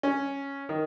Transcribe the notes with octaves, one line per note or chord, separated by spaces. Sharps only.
C#4
D#3